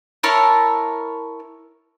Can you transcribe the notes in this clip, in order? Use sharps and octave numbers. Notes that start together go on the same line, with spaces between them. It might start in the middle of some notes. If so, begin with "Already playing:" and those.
E4 A#4 C#5 A5